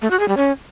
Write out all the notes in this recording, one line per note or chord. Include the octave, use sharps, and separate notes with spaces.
A3
F#4
G#4
G3
C#4